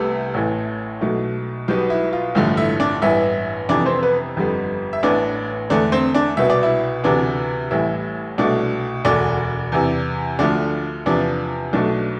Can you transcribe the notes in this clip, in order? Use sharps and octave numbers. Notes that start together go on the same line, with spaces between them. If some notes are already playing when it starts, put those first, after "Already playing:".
Already playing: C2 C3 G3 A3 B3 A4
A1 A2 E3
B1 B2 A3
B1 B2 G3 B3 G4
E4
F4
A1 G2 D3 F3 A3
E4 E5
D4 D5
A1 G2 E3 B3 E4 E5
F2 C3 E3 B3 D4 D5
C4 C5
B3 B4
G1 F2 D3 G3 B3
E5
A1 A2 E3 B3 D4 D5
E2 D3 A3 D4 D5
C4 C5
D4 D5
C2 B2 B3 E5
D5
E4 E5
D2 C3 E3 B3 D4 D5
A1 A2 E3 G3 E4 E5
C2 B2 A3 D4 D5
E1 D2 D3 D4 D5
E2 C3 E3
D2 D3 F3 A3 D4 D5
E2 C3 F3 B3 D4 D5
B1 B2 A3 D4 D5